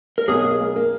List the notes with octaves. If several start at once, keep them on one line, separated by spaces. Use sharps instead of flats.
A#4
B1 G#4
A#3
A#3
A#3